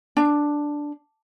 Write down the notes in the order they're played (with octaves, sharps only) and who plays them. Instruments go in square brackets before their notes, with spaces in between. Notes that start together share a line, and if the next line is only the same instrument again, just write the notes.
[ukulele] D4